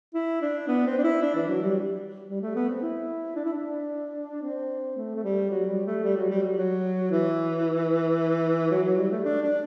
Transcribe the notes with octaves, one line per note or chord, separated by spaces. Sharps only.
E4
D4
B3
C4
D4
E4
D4
E3
F#3
G3
G3
A3
B3
C4
E4
D4
E4
D4
C4
A3
A3
G3
F#3
G3
A3
G3
F#3
G3
F#3
F#3
E3
F#3
F#3
G3
A3
D4
D4